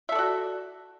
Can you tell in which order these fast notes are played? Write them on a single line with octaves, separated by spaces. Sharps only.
E5 A4 D5 F#4